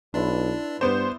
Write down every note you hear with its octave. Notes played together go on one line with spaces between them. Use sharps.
B1 D4 E4 B4 D5 C6
G2 B3 C5 D5